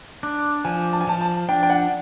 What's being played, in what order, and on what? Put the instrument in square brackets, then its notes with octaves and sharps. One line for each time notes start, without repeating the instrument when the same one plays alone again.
[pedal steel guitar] D4
[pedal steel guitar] F3 [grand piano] G#5
[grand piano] A5
G#5
[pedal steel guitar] F3 [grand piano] A5
[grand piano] A5
[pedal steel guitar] D4 [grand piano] G5
[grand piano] G5
F#5